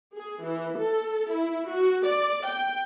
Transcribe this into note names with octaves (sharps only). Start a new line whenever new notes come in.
G#4
E3
A4
E4
F#4
D5
G5